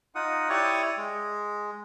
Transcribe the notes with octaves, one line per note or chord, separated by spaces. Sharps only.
D#4 F4 F#5 D#6
E4 G4 C#5 D5 C#6 D#6
G#3